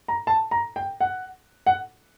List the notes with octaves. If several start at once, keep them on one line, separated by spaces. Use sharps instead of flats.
A#5
A5
A#5
G5
F#5
F#5